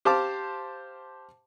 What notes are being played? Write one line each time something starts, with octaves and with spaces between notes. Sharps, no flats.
G4 C5 F5 A5 D6